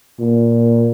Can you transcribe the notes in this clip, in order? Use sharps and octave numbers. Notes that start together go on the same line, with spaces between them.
A#2